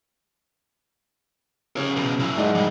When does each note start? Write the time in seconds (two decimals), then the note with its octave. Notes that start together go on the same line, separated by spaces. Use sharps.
1.76 C#3 A#4 C#5
1.96 B2 E3
2.20 F#3 E4
2.37 G#2 G#3 D5 D#5
2.55 E3 G3